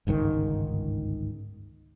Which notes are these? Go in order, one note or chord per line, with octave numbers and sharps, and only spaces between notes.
G1 C#2 G#2 D#3